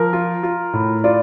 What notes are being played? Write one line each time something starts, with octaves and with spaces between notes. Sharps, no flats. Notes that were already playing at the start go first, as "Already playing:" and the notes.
Already playing: F3 A#4
F4
F4
A2
F4 D5